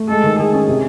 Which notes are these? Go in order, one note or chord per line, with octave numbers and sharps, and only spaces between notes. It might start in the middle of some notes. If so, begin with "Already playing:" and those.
Already playing: A3
G#3 A4
D#3
D#3 G#4
C#4
C3